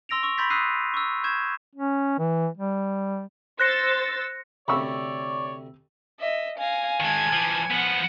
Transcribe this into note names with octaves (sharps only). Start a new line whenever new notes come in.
C6 E6 A#6 D7 F7
C#6 E6
B5 C6 G6 A6 B6
D#6 E6 F#6 B6 C7 D#7
C#6 E6
C#6 G6 G#6 E7
C#4
E3
G3
C5 E6 F#6 A6 A#6 C#7
D2 C3 C#5 D5 B5 C#6 E6
D#5 E5
F5 G#5 A#6
D#3 G#3 A5 G#6
E3 F3
F3 B3 F#5